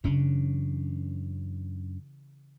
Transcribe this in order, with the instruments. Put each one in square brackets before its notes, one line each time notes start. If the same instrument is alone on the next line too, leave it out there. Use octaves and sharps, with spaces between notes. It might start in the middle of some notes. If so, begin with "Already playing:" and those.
[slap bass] F#2 C#4 D4 [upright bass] C#3 E3